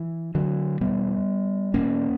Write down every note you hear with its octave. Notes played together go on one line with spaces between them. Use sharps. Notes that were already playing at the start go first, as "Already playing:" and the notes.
Already playing: E3
D3 F#3
E2 B2 G3 B3
E2 B2 A#3 C#4